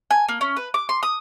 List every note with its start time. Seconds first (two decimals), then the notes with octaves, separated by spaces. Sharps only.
0.11 G#5
0.28 A#3
0.41 C#4
0.56 B4
0.74 D6
0.89 C6
1.03 D#6